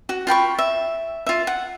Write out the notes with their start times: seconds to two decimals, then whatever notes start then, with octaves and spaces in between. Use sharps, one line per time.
0.09 F#4
0.27 F4 G5 B5 C#6
0.59 E5
1.26 F4 E5
1.47 F#5